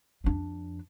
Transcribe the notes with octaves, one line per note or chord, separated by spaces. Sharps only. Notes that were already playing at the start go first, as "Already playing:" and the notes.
F2 D4